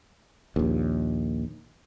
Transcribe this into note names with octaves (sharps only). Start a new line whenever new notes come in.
A#1 D#2